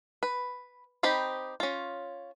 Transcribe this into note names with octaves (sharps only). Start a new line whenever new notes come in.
B4
C4 D#4 G4 B5
C#4 F4